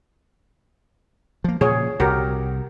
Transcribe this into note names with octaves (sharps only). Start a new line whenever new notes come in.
F3 A#3
A#2 C#3 F3 G#4 C#5
C2 F#4 G4 A#4